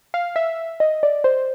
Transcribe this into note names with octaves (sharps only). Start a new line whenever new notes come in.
F5
E5
D#5
D5
C5